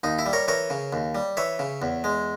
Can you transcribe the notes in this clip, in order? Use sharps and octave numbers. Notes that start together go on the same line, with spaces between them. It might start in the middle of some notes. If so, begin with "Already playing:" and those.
D#2 D#4
E4
G3
A#4 C#5
E3 A#4 C#5
C#3
D#2
G3
E3 C#5 E5
C#3
E2
G#3